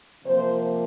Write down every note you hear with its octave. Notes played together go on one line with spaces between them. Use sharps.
C3 F3 A#3 C5